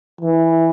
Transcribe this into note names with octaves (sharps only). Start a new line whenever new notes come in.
E3